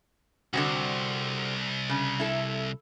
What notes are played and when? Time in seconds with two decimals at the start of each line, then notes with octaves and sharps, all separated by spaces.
0.54 C2 D3 C4 F#4
1.89 C#3
2.20 E4 A4